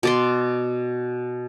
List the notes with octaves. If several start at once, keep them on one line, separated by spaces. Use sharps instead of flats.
B2 D5 C6